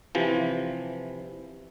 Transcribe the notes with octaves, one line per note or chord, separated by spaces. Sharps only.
C3 E3 F3